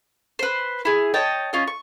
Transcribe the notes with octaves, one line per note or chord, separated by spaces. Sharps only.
B4 C5
E4 G#4
C#5 D#5 G5 A5
C#4 F4 D#5
C#6